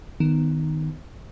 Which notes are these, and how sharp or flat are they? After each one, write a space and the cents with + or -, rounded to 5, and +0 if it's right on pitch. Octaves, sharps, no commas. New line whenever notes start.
D#3 -5 B3 +15